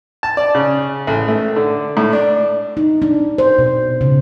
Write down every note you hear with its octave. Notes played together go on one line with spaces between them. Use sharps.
A5
D5
C#3
A1
A3
D3
A2
D4
D#4
D4
C5
B2
C#3